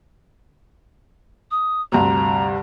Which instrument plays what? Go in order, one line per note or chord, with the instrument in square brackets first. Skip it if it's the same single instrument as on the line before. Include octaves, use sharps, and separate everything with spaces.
[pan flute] D#6
[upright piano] D2 G2 C3 [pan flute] A#5